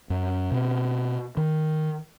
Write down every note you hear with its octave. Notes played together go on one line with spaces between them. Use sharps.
F#2
B2 C4
D#3